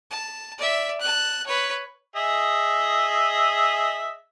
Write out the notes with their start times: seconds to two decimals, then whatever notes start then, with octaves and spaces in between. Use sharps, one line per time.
0.11 A5
0.58 D5 E5
1.01 A5 F#6
1.46 B4 C#5
2.16 G#4 D#5 E5